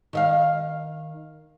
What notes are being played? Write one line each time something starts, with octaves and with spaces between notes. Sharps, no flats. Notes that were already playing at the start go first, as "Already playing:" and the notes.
D#3 E5 F5